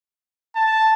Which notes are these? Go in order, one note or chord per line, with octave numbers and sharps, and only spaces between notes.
A5